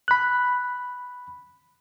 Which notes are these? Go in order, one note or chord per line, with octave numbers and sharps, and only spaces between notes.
B5 F#6